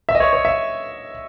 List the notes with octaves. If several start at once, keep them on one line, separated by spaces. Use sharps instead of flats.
E5
D#5
C#5
C#5
E5